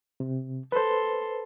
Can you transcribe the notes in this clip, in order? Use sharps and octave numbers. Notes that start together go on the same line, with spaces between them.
C3
A4 B4 C5 C6